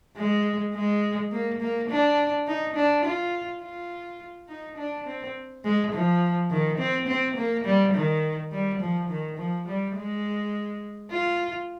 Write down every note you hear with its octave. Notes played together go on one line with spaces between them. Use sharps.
G#3
G#3
A#3
A#3
D4
D#4
D4
F4
F4
D#4
D4
C4
G#3
F3
D#3
C4
C4
A#3
G3
D#3
G3
F3
D#3
F3
G3
G#3
F4